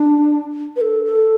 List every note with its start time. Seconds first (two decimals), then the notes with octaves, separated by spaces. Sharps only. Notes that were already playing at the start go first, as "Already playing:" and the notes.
Already playing: D4
0.76 B4
0.81 A4
1.05 A4